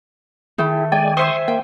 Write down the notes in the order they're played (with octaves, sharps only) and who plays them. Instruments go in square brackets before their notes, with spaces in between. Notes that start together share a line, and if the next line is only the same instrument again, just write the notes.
[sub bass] D#3 [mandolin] A3 [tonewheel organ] E4 [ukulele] G#4 G5
[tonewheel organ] G#3 D5 G#5 [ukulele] G5
[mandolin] C5 E5 G#5 [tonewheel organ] C6 C#6 D#6
[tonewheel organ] A#3 [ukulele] G5